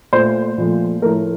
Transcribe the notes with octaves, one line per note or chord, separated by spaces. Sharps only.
A#2 A3 C5
A#2 F3 A3
A2 F3 A3 A#4